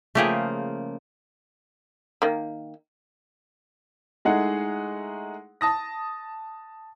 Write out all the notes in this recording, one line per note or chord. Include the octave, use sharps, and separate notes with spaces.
C#3 F3 A3 A#3 G4 G#4
D#3 A#3
G#3 A3 D#4 E4 G#4 F#5
A5 D#6 A#6